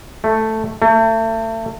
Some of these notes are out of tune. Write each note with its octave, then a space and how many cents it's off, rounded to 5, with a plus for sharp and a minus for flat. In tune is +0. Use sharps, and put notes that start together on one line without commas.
A3 +5
A3 +35